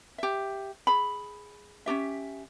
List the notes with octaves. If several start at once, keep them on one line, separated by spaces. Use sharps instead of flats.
G4 E5
G#4 B5
C#4 D4 G4 E5